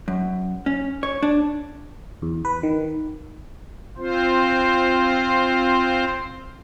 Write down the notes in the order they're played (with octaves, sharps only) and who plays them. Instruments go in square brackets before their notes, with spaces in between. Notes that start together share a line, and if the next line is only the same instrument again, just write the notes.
[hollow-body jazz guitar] F#2
C#4
C#5
D4
[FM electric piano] E2
B4
D#3
[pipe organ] C4 F4 C5